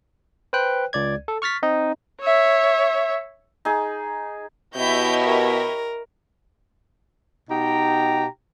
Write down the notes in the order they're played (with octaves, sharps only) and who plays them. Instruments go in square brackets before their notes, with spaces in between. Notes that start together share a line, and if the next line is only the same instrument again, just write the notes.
[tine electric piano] B4 C5 G5 F#6
C#2 D5 G#6
A4
C#6 F6 A6 B6
C4 D#4 D#5
[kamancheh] C#5 E5
[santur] D#4 G#4
[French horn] B2 [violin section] E4 G4 E5 [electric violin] C#5 D#5 [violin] G6
[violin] A#4
[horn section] B2 D#4 G4 G5 A#5